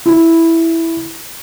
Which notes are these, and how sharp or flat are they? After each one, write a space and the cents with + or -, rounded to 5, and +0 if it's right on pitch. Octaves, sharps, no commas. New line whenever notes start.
E4 +0